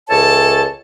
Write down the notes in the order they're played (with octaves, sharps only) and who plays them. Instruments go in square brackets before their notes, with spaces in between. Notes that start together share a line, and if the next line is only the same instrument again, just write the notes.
[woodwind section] C#2 E3 A4 C#5 A5